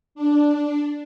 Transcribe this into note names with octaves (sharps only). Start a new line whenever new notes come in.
D4